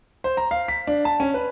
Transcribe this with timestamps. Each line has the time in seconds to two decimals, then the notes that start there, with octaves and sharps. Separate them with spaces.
0.24 C5
0.37 A#5
0.51 F5
0.68 B6
0.87 D4
1.05 A5
1.20 C#4
1.34 B4